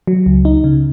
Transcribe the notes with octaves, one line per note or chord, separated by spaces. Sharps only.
F#3
C#2
D#4
C#3